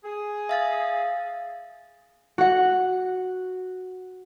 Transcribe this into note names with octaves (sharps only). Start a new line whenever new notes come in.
G#4
E5 F5 A6
F#4 F#5